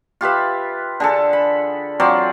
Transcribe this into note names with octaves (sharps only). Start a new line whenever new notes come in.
F4 G4 B4 E5
D3 G#4 A4
B5
F#3 C4 F4 D5